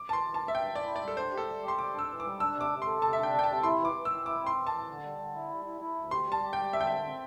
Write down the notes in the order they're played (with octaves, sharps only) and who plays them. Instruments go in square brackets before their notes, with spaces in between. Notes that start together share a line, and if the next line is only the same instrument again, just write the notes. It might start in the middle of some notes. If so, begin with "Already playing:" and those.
Already playing: [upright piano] D6
[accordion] E3 [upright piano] A5
[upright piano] C6
[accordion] E3
[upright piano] A5
[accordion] G2
[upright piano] E5
[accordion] G2 [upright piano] G5
[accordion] E3
[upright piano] D5
[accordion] E4
[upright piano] D5
[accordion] G3
[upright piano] A4
[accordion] D4 [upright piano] C5
[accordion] G4
[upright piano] A4
[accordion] G3
G4
[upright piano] C6
[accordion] G3 [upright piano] D6
[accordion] D4 [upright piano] E6
[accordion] E3
[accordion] G3 [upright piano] D6
[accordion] D4 [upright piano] E6
[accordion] C3
[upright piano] D6
[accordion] C3
[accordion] A4 [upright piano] C6
[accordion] C3 [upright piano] A5
[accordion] D4 [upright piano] E5
[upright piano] G5
[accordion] A4
[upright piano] G5
[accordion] C3 [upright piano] A5
[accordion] E4 [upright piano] C6
[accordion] E3 [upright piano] D6
[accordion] E3
[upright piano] E6
[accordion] E3
[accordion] E4 [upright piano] D6
[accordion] C4
[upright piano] C6
[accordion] E3
[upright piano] A5
[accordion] E3
D3
G3
D3
E4
G3
E4
E4
D2
[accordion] G4 [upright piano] C6
[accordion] G3 [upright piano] A5
[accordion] G4
[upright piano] G5
[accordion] G3
[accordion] D3 [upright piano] E5
[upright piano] G5
[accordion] C4 [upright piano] E5
[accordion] C4